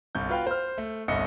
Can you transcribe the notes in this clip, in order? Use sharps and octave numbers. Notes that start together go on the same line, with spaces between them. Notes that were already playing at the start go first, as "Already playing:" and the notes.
G1 C2 G6
F4 F#4 B4 F5 G5
C5 F6
A3
G1 C2 D#5 E5 C#7